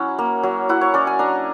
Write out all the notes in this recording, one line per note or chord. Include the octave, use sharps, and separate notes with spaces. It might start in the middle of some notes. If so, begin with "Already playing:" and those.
Already playing: F#3 C#4 E4 F#5
A#3
F#3
E4 F#5
C#5
C#4 D5
G#5
D4 A#5